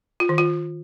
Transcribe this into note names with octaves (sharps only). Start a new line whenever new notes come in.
F4
D#3
F4